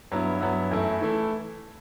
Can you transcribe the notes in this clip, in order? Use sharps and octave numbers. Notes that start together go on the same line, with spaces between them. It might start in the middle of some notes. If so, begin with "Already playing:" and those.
G2 F#3 B3 E4
G2 F#3 B3 E4
F#2 E3 A3 E4
E3 A3 E4